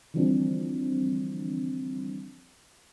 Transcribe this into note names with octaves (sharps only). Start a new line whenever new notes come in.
D3 E3 F3 G3 C4 D4